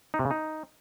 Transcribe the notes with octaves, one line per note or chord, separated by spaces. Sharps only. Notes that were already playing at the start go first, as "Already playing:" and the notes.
D#4
C3
C#3
D#4